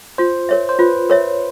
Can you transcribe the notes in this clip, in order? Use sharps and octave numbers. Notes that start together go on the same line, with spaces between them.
F4 C5
A#4 C#5 E5
C5
F4 B4
A#4 C#5 E5